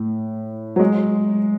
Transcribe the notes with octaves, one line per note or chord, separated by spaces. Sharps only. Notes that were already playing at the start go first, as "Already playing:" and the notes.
Already playing: A2
F#3
G#3